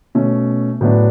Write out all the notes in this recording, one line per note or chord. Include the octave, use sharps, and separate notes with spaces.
B2 A3 C#4
A2 F#3 B3 D4